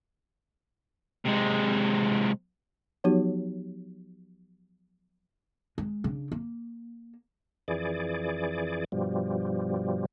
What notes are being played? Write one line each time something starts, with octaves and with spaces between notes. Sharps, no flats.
C3 G#3
F3 F#3 B3 D#4 F#4 G4
G#3
C#3 D4
A#3
F2 E3 G#4 D5
G2 B2 F3 G3